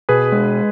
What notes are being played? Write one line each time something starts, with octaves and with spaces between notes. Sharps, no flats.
B2 G#4 B4
G#3